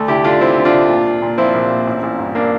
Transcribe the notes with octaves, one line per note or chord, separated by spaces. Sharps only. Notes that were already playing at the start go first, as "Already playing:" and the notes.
Already playing: D2 A3
D3 E4 G4
D3 D4 F4
D2 C4 E4
D3
D4 F4
D2
A#2
A#2
A#2
F3 C4 E4
A#1
A#2
A1
A1
G2
A#3 D4